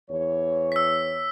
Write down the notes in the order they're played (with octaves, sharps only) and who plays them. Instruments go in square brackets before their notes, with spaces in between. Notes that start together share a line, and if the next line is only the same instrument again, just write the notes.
[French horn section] E2 E3 C#5
[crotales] E6 B6